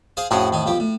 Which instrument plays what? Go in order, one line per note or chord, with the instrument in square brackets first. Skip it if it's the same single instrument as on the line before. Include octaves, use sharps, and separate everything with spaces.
[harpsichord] G#4 C5 F5
[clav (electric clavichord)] F2 A2 [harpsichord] C#4 F#4 G#4
[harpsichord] D#3 D#4
B1 F3 G4
A2